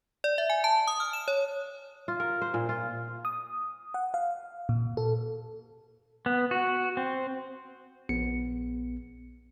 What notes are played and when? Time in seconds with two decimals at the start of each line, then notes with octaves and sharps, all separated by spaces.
0.24 D5
0.38 E5
0.50 G#5
0.64 A5
0.87 D#6
1.00 F6
1.13 E7
1.28 C#5
2.08 F4
2.20 A#4
2.42 C5
2.54 A#2
2.69 F4
3.25 D#6
3.94 F#5
4.14 F5
4.69 A#2
4.97 A4
6.26 B3
6.51 F#4
6.97 C4
8.09 A#1 B3 C#7